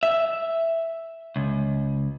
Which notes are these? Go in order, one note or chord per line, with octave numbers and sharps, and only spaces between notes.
E5
C#2